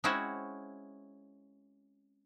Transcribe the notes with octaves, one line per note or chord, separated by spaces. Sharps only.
G#3 C4 C#4 E4 F#4